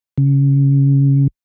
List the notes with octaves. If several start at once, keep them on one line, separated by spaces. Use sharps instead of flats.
C#3